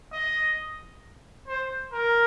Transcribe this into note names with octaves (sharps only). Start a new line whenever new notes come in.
D#5
C5
A#4